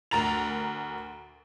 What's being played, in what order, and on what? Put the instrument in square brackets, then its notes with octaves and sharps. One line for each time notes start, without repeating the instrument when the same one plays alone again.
[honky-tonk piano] D2 A#4 A#5 A6 F7